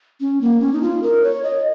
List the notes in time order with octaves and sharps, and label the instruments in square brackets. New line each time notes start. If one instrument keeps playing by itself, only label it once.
[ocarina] C#4
A#3
C#4
D#4
F4
A#4
C#5
D#5